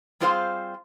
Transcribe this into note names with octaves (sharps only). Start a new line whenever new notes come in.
G3 C4 F4 G#4 C5 F5